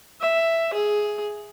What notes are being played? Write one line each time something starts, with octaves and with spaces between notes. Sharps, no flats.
E5
G#4